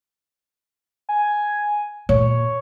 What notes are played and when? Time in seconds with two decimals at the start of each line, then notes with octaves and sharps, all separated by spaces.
1.09 G#5
2.09 A#2 C#5